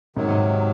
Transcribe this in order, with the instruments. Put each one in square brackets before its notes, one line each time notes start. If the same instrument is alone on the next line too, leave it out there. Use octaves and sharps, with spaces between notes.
[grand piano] G#2 [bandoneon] C3 D#3 F#3